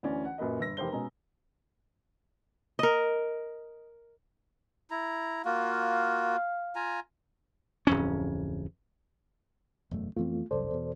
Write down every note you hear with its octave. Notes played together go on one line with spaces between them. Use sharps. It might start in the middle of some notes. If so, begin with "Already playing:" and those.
D2 E3 C#4 D5
F#5
F#2 A#2 B4 D#5
G1 E6 A#6
F1 G4 A#4 C5 G7
B2 G#3 C#4 A#5
A#4 D#5
E4 A#5
A#3 F4 F#4 F5
F4 G#5 A#5
D1 F2 C#4
E1 F#2 A3
F2 E3 A3 B3 C4 F4
F1 C2 F#2 A4 C5 D5
E2 B2